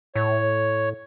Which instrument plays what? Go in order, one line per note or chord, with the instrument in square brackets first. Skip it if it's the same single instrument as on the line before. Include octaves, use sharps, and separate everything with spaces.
[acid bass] A2 [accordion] C#5